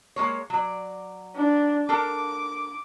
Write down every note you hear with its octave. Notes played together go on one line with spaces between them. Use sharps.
G#3 A#3 C#5
F#3 D5
D4
D4 A4 A#4 D6